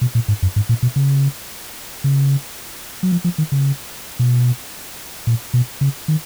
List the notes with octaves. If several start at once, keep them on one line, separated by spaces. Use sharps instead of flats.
B2
A#2
G#2
F#2
G#2
A#2
B2
C#3
C#3
F#3
F3
F3
D#3
C#3
B2
A#2
B2
C#3
D#3